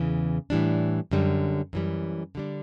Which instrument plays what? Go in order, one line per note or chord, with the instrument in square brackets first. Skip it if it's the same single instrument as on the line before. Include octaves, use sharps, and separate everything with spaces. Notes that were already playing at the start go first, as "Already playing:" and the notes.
Already playing: [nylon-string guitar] E2 C#3 E3
A2 E3 G3 D4
F#2 D3 G3
F#2 E3 G3
D3 G3 D4